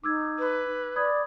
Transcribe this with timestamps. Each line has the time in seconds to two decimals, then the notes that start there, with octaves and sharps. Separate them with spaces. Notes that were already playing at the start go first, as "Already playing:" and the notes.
0.04 D#4 D6 E6 G#6
0.39 B4
0.96 D5 B5 D#6 G#6